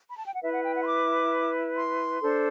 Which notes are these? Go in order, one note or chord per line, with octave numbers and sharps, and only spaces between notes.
B5
A5
G5
F#5
E4 B4 E5
F#5
G5
F#5
C6
D6
C6
D4 A4 C5